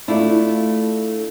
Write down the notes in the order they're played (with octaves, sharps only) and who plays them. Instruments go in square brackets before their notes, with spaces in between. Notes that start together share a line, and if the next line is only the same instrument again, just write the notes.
[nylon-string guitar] A3 D4 E4 F4